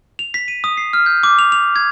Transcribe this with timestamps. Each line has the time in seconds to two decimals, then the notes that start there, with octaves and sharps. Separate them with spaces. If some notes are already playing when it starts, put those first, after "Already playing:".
0.19 F7
0.34 B6
0.48 D#7
0.64 D#6
0.77 C7
0.93 F6
1.06 G6
1.23 D6
1.39 F7
1.52 F7
1.76 G#6